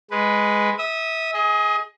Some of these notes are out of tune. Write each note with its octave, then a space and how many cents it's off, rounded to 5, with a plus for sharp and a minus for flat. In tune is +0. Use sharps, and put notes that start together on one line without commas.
G#3 +0 B4 +0
E5 -25 D#6 +0
G#4 +0 D#5 +30